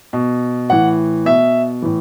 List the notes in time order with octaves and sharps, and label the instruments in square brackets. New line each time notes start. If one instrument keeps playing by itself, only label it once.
[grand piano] B2
A2 E3 F#5
B2 E5
A2 E3